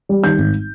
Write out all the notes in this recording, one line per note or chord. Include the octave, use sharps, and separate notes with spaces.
G3
D#3 G6
G#1